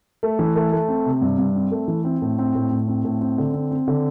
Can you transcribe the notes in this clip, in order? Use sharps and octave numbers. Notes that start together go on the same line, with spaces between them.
A3
E3
A3
A3
C4
C3
G2
G2
C4
A3
E3
C4
A2
C4
A2
A2
C4
A2
C4
D3
C4
C4
D3